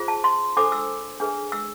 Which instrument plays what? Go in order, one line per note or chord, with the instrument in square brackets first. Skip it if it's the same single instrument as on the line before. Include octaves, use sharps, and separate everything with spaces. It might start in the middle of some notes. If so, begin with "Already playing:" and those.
Already playing: [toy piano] F4 G#4 C5
A5
C6
D4 A4 C5 D6
E6
D4 G#4 B4
E6